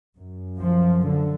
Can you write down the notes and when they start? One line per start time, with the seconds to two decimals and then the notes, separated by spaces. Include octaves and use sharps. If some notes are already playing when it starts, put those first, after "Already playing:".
0.17 F#2
0.60 F3
1.04 D3